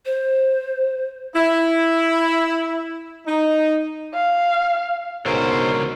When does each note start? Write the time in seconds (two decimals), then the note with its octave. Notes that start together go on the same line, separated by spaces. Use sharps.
0.06 C5
1.35 E4
3.26 D#4
4.14 F5
5.26 C#2 G#2 B2 D3 A#4 C5 C#5